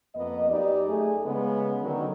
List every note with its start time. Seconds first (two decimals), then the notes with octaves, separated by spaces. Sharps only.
0.15 F2 A#3 B3 D#5
0.49 F#2 D#4 G4 D5
0.88 A3 G#4
1.24 C#3 G#3 B3
1.81 D3 D#3 F#3